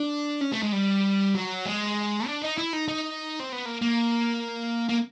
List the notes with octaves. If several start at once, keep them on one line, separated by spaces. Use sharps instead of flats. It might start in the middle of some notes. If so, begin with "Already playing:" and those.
Already playing: D4
C#4
A3
G#3
G3
F#3
G#3
D4
D#4
E4
D#4
D#4
C4
B3
A#3
A#3
A#3